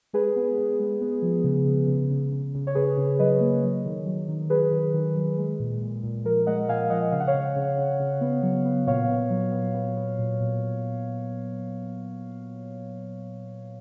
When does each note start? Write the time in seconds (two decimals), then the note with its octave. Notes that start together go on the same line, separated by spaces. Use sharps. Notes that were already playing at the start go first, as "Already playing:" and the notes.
0.13 G#3 G#4 B4
0.36 B3
0.57 B3
0.80 G#3
1.01 B3
1.22 F3
1.44 C#3
1.66 C#3
1.88 C#3
2.10 C#3
2.32 C#3
2.54 C#3
2.67 C#5
2.75 C#3 G#4 B4
2.97 C#3
3.19 F#3 B4 D#5
3.41 A#3
3.63 F#3
3.85 D#3
4.06 F#3
4.28 D#3
4.50 F#3 G#4 B4
4.72 D#3
4.94 D#3
5.16 F#3
5.38 G#3
5.60 A#2
5.82 A#2
6.03 A#2
6.24 F3 A#4
6.46 G#3 D#5 F#5
6.69 A#2 F5 G#5
6.90 F3 D#5 F#5
7.12 C#3 F5
7.20 F#5
7.28 C#5 F5
7.33 C#3
7.56 C#3
7.78 C#3
8.00 C#3
8.21 B3
8.43 F#3
8.65 B3
8.87 A#2 C#5 F5
9.09 B3
9.30 F#3
9.52 B3
9.74 B3
9.97 B3
10.18 A#2
10.40 A#2